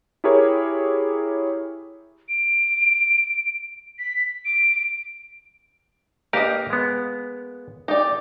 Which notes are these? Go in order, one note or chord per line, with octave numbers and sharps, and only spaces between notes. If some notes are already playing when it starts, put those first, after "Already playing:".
E4 G4 G#4 A#4 C#5
D7
B6
D7
A#3 G4 A#4 B4 D#5
G#3 B3
D#4 G4 D5